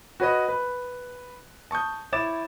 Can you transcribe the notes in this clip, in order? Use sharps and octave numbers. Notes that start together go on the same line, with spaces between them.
F#4 B4 C#5 D#5
B4
A5 C#6 D#6 G6
E4 C#5 D6 A6 E7